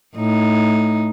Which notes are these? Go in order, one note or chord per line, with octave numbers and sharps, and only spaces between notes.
A2 D#4